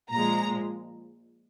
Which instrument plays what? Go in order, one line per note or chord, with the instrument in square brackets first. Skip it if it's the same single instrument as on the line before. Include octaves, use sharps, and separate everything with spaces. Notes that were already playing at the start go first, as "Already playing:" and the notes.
[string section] A#2 F3 G#3 A#5